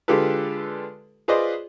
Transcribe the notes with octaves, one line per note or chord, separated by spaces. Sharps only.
D3 G#3 F4 G4 A4 B4
F4 G#4 B4 C5 D5 D#5